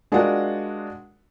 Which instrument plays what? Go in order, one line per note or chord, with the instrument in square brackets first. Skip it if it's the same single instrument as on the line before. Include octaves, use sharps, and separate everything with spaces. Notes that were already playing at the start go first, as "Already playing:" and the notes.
[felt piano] G#3 D4 F4 F#4 A#4 F#5